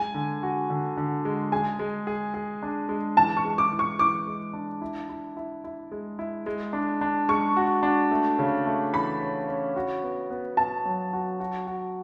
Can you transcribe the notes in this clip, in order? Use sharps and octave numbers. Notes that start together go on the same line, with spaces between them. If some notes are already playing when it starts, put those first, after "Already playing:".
Already playing: G#3 G#5
D3
F#4
D3
D3
G#3
G#4 G#5
G#3
G#4
G#4
D4
G#3
E3 A5
C#6
G#3
D6
E3
C#6
E3 D6
G#3
D4
E4
E4
E4
E4
G#3
E4
G#3
D4
D4
G#3 C#6
F#4
D4
A3
C#3
A3
E3 B5
C#4
C#4
F#4
B3
B3
B3 A5
F#3
F#4
F#4
F#4